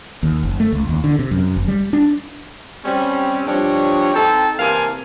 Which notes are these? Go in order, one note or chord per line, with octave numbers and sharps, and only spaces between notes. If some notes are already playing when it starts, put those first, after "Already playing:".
D#2
F#1
A3
C#2
D#2
D3
C3
F#2
F#1
G3
D4
G3 C4 C#4
G2 F3 G3 D4 C#5
C4 D#4 A4 G5 A5 A#5
C3 E3 A#3 F5 G#5 A5